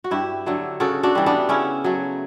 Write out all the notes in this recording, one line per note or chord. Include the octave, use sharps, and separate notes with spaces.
F#4
G2 E4 G4
D3 F#3 A3
C#3 F#4 A4
D4 F#4
E3 G3
B3 D4
C#3 C#4 E4
F#3 A3